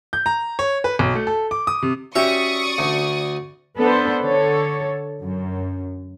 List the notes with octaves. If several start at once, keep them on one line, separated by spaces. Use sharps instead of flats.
G6
A#5
C#5
B4
B1
A3
A4
D6
D#6
C3
C#4 F#4 G4 D5 E5 C#6 D#6
D2
B3 D4 A4 B4 C5
D3 A4 C#5
F#2